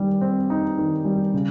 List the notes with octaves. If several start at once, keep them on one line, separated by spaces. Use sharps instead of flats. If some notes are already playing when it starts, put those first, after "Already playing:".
Already playing: D#3 G3
C4
D#4
D#3
G3
C#3